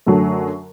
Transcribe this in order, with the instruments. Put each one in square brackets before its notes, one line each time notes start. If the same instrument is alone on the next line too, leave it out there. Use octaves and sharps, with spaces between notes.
[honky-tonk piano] F#2 D3 F#3 A3